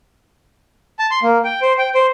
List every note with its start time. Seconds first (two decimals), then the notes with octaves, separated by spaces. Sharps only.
0.99 A5
1.11 C6
1.23 A#3
1.44 G5
1.62 C5
1.78 G5
1.95 C5